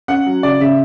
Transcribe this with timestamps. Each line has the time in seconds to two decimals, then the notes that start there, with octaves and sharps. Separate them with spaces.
0.08 C#4 F#5
0.26 F#3
0.43 C#3 D5
0.60 C#3 E5